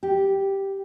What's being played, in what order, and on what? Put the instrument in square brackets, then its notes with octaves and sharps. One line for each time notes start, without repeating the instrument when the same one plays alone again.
[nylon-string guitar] G4